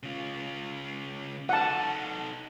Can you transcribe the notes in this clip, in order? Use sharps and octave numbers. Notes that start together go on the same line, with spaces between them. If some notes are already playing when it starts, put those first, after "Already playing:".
C#3 F4
D#4 A4 F#5 A5